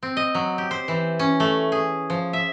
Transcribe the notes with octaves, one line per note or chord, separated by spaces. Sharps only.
C4
D#5
F#3
G4
C5
E3
C#4
A3
G#4
F3
E5